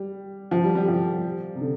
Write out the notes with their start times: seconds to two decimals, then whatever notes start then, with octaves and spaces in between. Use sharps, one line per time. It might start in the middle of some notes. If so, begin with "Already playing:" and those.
Already playing: G3
0.51 F3
0.64 G3
0.75 G3
0.88 F3
1.55 C3
1.61 D3